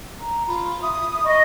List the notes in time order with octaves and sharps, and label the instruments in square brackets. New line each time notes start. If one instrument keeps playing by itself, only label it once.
[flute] A#5
[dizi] F4 [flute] B5
[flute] E5 [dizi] D#6
[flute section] D#5 [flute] C#6